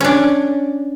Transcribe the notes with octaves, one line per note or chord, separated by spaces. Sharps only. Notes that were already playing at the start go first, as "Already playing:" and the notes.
C#4 D4